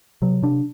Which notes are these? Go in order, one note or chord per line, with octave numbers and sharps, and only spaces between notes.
C3 F#3
C3 D4